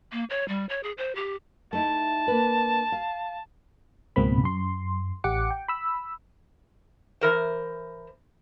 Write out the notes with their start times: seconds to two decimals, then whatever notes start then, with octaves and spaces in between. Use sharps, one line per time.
0.13 A#3
0.30 C#5
0.48 G3
0.69 C#5
0.83 G#4
0.98 C5
1.15 G4
1.73 A3 D#4 E4 A5
2.28 A#3 D4 B4
2.92 F5
4.16 C#2 G#2 B2 A#3 C4 B5
4.44 F#2 C6
5.24 A1 G4 F#5 D6 C#7
5.51 G5
5.68 B5 E6
7.21 E3 A#4 C5